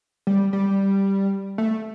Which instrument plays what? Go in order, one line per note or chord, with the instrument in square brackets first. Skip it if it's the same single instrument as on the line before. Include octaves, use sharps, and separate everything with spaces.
[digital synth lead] G3
G3
A3